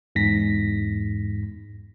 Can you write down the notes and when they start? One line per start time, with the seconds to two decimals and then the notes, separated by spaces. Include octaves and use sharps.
0.15 E2 G#2 A#6 B6